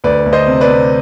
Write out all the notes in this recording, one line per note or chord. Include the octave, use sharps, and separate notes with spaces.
D2 B4 D5
D2
C5 D#5
C3
B4 D5
C3